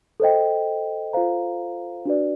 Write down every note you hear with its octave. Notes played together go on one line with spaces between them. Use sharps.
A4 C5 D#5 G5
F4 A4 C5 F5 A#5
D4 F#4 B4 D5